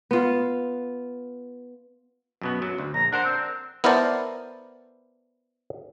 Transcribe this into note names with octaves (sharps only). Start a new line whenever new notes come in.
B3 F4
F#2 B2 B3
F#2 F#3
D2
A#1 A#5
D4 A#4 C5 F#5
C4
B3 E4 A#4 C5 D5 A5